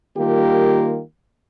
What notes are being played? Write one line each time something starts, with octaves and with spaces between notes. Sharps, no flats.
D#3 G3 A#3 F4 G4